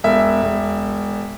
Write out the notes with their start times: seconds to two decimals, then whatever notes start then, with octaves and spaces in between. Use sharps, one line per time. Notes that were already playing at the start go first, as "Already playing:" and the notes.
0.04 E1 E5
0.43 E1